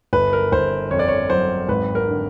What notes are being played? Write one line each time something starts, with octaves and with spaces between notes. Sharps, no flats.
G1 B4
A#4
G1 C5
F2 C#5
D5
C#5
F#3 C5
G#1 B4
A#4
D3